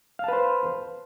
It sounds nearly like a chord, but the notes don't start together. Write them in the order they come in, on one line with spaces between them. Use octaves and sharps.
F5 A5 B4 C5